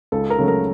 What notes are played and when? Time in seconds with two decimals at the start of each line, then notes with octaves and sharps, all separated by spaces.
0.12 C#2 A4
0.30 A#4
0.39 C#3 F#3 A3
0.48 A#4